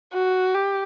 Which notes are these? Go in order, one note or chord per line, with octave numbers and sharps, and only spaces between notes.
F#4
G4